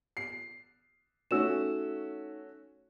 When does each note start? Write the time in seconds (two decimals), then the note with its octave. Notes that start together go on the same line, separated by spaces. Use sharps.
0.17 C7
1.31 A3 C#4 D#4 F#4 E6 E7